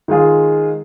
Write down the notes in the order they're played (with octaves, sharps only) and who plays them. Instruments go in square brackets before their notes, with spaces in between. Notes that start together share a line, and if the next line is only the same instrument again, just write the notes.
[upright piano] D#3 G#3 F4 G#4